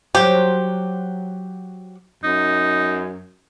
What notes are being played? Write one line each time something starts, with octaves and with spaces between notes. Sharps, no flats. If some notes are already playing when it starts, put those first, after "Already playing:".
F#3 G4 C5
F#2 D#4